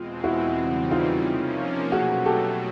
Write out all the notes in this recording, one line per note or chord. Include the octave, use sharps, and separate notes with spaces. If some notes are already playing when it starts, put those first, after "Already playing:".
Already playing: E2 B2 G#3 C4 F4
E4 F#4
E2 C#3 E3 G3 C4
D#4 F4
C3 F3 A#3 C#4
B2 F#3 A3 F#4 G#4
G4 A4